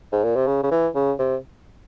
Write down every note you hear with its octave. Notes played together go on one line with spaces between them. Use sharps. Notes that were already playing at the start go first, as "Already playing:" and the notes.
G#2
A#2
C3
C#3
C#3
E3
C#3
C3